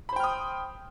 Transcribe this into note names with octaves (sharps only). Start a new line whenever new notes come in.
C5 G5 B5 D#6 F6